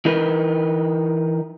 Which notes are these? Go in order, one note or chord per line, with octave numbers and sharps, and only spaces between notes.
E3 D#4 A#4 B4